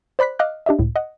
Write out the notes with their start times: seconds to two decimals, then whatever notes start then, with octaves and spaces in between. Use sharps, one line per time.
0.19 C5 D5 B5 F#6 B6
0.39 D#5 F5 D6 F6 F#6
0.66 D4 G4 D#5 E5
0.79 C#2 A2
0.96 D#5 F#5